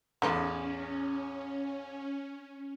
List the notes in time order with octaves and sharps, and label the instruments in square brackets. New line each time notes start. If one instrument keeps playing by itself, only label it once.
[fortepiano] A1 E2 [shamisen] A3 D#4 F4 [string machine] C#4